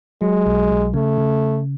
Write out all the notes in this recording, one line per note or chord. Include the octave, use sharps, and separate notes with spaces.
F#3 G#3
B1
B1
C#3 A3
C#3